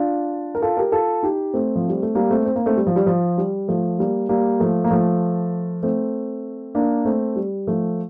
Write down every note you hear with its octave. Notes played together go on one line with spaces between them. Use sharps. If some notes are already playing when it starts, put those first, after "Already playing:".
Already playing: D4 F4
A#4
F4 A4
G4 A#4
F4 A4
D#4 G4
A3 C4
F3
G3
A3
G3 A#3
A3 C4
C4
A#3
A3 C4
G3
F3
G3
F3
G3
F3 A3
G3 A#3
G3 A#3
F3 A3
A#3
F3 A3
A3 C4
A#3 D4
A3 C4
G3
F3 A3